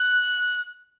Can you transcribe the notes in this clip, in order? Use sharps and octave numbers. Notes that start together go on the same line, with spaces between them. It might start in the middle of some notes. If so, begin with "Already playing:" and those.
Already playing: F#6